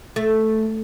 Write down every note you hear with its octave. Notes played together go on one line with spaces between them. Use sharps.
A3